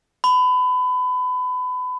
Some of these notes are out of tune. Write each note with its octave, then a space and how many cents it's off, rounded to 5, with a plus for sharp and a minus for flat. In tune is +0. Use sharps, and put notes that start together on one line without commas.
B5 +30